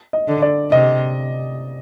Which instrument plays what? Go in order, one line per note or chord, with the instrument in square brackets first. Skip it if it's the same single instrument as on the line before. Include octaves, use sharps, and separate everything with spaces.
[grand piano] D#5
[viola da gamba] D3
[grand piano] D5
[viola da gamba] C3 [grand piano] D#5